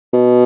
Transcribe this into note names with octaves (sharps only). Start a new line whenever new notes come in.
B2